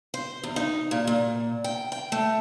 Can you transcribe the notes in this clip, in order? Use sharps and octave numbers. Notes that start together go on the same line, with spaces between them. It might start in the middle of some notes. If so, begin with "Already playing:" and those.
C5
E2
D#4
A#2
A#2
G5
G5
A3